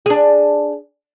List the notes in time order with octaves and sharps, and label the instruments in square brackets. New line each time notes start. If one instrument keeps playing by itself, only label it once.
[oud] D4 G#4